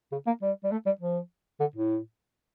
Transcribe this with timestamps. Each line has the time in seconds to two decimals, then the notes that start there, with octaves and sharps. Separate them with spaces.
0.12 C#3
0.27 A#3
0.42 G3
0.64 G3
0.71 A3
0.86 G3
1.01 F3
1.60 D3
1.75 A2